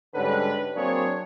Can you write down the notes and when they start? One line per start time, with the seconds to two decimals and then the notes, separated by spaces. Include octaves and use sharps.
0.15 G#2 D3 G3 C#4 B4
0.76 F#3 A#3 C4 D4 G#4 C#5